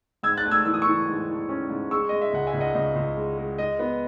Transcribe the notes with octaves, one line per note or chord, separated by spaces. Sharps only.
G#2 E6 G#6
F#6 A6
A3
E6 G#6
E3 E6
D#6
E3 C#6 E6
G#2
E3
C#4
G#2
G#3 C#6 E6
G#3 D#5
E5
C#2 F#5
E5 G#5
C#2
D#5 F#5
C#2 D#5
C#2
G#3
G#3
G#3 D#5
B3